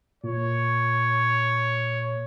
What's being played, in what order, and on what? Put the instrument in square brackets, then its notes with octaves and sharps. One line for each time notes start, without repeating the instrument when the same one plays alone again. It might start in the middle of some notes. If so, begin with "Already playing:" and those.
[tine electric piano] A#2 [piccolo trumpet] C#5